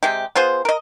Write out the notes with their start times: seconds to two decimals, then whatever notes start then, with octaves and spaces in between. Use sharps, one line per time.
0.03 C3 G#3 G4
0.35 B3 F4 G#4 C5
0.65 A#4 D#5